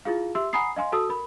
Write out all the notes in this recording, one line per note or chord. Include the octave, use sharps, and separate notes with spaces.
E4 F4 G#4 F5
G4 E5 C6 E6
F#5 G#5 A#5 B5 D#6 C7
D#5 F5 G#5 C6
F#4 A4 A5 D#6 E6
A#4 B5